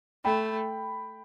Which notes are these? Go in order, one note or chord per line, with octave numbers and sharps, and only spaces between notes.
A3 G5 B5